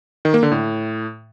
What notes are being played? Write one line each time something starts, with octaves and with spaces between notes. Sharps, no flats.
D#3
A#3
D3
A2